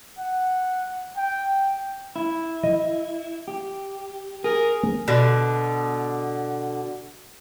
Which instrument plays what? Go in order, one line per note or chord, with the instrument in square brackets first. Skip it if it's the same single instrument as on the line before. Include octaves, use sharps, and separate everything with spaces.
[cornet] F#5
G5
[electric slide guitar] E4
[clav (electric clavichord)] D#5
[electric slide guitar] G4
[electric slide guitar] G#4 [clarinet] A#4
[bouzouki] B2 D3